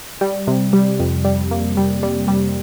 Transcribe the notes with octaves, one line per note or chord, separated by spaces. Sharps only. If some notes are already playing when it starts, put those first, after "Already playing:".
G3
C3
G3
F2
G3
A#3
G3
G3
G3